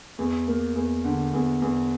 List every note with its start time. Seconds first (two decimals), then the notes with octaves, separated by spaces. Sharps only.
0.19 E2
0.47 A#3
0.76 E2
1.04 D3
1.33 E2
1.62 E2